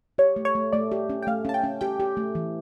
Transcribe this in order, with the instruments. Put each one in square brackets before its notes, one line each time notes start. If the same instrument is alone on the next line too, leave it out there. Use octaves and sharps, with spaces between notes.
[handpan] G4 [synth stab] C#5
[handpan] A3
[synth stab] C#5
[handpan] A3
[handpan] A3 [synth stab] D5
[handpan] G4
C#4
[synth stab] G5
[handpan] A3 [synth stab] F5
[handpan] C#4 [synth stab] A5
[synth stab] G5
[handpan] C#4
[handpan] G4 [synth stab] G5
[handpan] G4
A3
E3